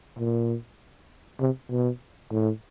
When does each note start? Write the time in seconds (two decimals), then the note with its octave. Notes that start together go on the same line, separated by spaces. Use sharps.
0.19 A#2
1.40 C3
1.71 B2
2.31 A2